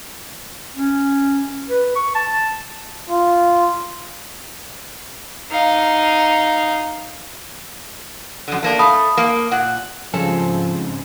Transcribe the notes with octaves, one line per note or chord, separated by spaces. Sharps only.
C#4
B4
C#6
A5
F4
D#4 F5
F#2 D3
A3 A#3 D4
A3 F5 A5 B5 D#6
A#3
A#2 F#5
G#2 C#3 F3 G3 C4 C#4 A4